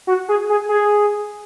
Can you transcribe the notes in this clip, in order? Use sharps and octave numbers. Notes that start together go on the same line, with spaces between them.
F#4
G#4
G#4
G#4